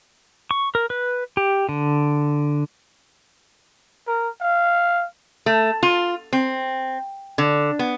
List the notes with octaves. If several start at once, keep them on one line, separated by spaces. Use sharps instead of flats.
C#6
A#4
B4
G4
D3
A#4
F5
A3
F4
C4
D3
B3